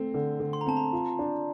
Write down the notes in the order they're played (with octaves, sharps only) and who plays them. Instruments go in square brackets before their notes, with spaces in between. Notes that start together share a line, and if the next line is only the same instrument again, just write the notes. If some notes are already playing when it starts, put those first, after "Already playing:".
Already playing: [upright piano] A3 C4
D3
D3
[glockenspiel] C6
A#5
[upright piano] C4 [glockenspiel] A5
[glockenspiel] A#5
[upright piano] F4
D4